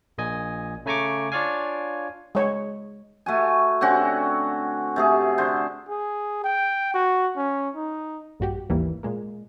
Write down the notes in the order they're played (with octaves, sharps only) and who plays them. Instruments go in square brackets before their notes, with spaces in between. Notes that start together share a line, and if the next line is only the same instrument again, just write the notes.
[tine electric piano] A#1 A#2 D#5 G#5
C#3 A3 G#5 A#5 C#6 D6
D4 F4 C#5 D5 F5 G#5
[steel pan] G#3 C#5
[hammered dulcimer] A3 F#4 G#5
D3 C4 C#4 F#4
C3 A3 G#4
D3 C5
[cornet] G#4
G5
F#4
C#4
D#4
[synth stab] A#1 G2 F#4 G4
G#1 D#2 E3 G3 A#3
A#2 G#3 A#3